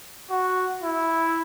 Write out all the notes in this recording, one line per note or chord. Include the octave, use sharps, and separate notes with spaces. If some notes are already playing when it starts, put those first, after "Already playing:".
F#4
E4